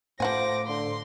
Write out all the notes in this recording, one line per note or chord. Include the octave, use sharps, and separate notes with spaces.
A2 F3 C5 F#5 G#5 D6 A#6
D3 C6